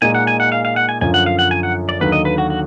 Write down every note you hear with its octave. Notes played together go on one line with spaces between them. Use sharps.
A#2 G#3 D#4 G#5
F#5
G#5
F#5
F5
F5
F#5
G#5
F#2 D3 F3 G#5
F#5
F5
F#5
G#5
F#5
D5
D#2 D3 F#3 B4
D#5
B4
F#4
F#4